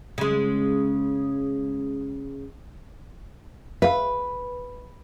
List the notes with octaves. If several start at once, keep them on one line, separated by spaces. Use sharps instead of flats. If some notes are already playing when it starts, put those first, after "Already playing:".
C#3 G#3
B4 E5 F5